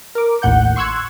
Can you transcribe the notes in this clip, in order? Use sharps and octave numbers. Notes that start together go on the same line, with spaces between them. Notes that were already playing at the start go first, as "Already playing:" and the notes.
A#4 D6
A1 D#2 A2 F#5 G6
C6 C#6 E6 F#6 G#6